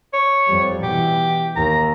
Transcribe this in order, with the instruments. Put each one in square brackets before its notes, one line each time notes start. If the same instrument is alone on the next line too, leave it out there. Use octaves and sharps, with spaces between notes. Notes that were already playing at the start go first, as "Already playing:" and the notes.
[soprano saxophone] C#5
[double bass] F2 G3
[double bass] B2 E3 [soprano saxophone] G4
[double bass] D#2 [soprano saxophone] A#5